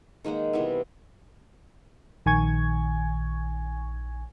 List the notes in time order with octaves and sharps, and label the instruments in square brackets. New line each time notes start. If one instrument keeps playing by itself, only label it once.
[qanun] D#3 G#3 A#3 F#5
C3 E3 G3 B3
[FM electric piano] A#1 D#3 G#5 C#6 G#6